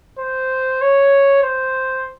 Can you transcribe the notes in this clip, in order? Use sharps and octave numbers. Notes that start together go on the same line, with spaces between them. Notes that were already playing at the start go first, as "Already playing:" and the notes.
C5
C#5
C5